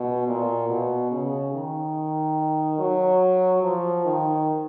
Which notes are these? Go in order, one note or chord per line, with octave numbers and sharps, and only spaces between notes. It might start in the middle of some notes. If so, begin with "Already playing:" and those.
Already playing: B2
A#2
B2
C#3
D#3
F#3
F3
D#3